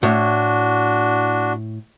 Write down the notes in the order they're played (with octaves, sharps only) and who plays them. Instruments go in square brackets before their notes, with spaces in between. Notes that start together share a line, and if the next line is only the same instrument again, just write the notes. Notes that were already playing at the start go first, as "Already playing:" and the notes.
[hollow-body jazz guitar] A2 [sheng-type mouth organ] D4 F#4